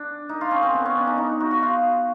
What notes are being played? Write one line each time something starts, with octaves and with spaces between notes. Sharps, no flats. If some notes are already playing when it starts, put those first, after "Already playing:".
Already playing: D4
D#4
F4
C#4
C4
B3
C#4
D4
D#4
D#4
F#4
F#4
F4